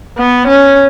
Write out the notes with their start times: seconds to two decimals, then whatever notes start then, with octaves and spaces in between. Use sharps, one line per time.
0.18 B3
0.47 C#4